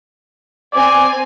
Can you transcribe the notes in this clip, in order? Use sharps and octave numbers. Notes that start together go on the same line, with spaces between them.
C4 D5 G#5